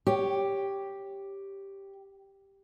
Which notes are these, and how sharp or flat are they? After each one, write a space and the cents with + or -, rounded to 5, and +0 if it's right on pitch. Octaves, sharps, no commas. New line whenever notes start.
G4 +0 C#5 +0